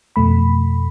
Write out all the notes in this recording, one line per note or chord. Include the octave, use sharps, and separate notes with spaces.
F2 B2 A3 B5